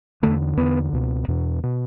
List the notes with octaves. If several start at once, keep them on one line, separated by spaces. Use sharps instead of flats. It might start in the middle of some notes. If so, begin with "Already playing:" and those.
E2 D3 A3
E2 D3 B3
C#2 B2
E2 B2
B2